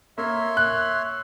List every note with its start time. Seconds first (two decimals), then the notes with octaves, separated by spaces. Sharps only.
0.18 A#3 C#5 E5 C6
0.57 F#6